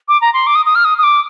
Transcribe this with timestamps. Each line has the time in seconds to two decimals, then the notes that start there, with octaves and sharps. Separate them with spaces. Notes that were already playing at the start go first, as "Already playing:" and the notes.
0.08 D6
0.21 A#5
0.33 C6
0.47 D6
0.55 D#6
0.66 D#6
0.75 F6
0.85 D#6
0.98 D#6
1.03 D6